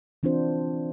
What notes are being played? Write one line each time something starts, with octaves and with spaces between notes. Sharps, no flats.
E3 C4 D4 F4 C5